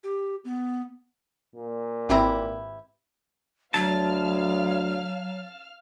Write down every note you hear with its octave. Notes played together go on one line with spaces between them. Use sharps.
G4
B3
A#2
G#1 C4 E4 G4 B4 A#5
D2 F#3 F5 A5 F6